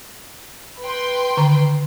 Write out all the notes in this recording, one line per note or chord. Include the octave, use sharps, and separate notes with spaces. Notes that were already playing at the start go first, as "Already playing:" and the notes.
B4 G5 C6
D3 D#3 A#5